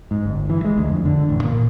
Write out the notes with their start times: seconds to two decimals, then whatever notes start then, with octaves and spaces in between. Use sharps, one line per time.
0.11 G#2
0.26 G1
0.50 E3
0.65 G#3
0.78 D2
0.89 F2
1.05 D3
1.29 A1
1.43 A#2